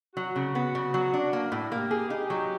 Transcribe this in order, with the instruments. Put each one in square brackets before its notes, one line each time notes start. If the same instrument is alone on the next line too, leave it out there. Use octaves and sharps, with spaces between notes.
[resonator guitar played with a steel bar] F#3 [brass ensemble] F#4
[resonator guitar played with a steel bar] C#3
B3
C#3
F#3
D4
A#3
A2
[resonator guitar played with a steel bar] A#3 [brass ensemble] G4
[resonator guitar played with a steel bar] G#4
D#4
F#3